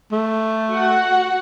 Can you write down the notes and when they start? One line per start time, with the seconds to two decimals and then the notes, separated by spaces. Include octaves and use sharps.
0.12 A3
0.70 F#4 F#5